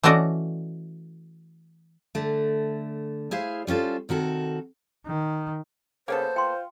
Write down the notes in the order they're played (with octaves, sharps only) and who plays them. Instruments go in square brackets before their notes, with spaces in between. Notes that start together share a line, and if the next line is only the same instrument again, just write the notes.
[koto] E3 A3 C#4 F#4 D5 D#5
[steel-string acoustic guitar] D3 A3
E4 G#4 C5 F5
G3 C#4 F4 A4 C5
C3 D#3 F#4 A4
[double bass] D#3
[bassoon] C#3 [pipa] A#3 B3 A4 [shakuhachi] C5
[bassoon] F4 [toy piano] G5 C6